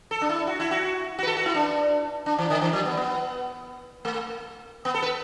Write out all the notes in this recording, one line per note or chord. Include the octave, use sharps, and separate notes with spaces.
A4
D4
E4
F#4
E4
F#4
F#4
B4
A4
F#4
E4
D4
D4
E3
D3
E3
F#3
B3
B3
A3
B3
A4
B4